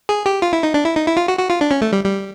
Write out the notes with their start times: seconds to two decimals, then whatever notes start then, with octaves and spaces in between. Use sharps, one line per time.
0.09 G#4
0.26 G4
0.42 F4
0.53 E4
0.63 D#4
0.74 D4
0.85 E4
0.96 D#4
1.07 E4
1.17 F4
1.28 F#4
1.39 F#4
1.50 F4
1.61 D4
1.71 C#4
1.82 A3
1.92 G3
2.04 G3